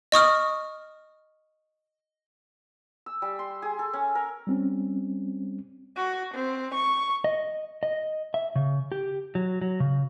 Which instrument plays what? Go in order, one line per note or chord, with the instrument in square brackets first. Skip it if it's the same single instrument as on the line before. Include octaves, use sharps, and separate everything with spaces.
[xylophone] D#5 C#6 D#6 F6
[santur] E6
G3
C6
G#4
A4
C#4
A#4
[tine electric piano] G3 C4 C#4
[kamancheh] F#4
C4
C#6
[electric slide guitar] D#5
D#5
E5
C#3
G4
F#3
F#3
C#3